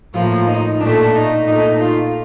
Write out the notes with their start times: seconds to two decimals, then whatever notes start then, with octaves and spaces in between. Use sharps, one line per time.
0.14 A2 F3 A#3 F4
0.47 D#4
0.80 A#2 A3 D4
1.14 D#4
1.47 A#2 A3 D#4
1.80 F4